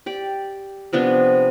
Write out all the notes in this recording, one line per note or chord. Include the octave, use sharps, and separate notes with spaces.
G4 D5
C3 F3 B3 D4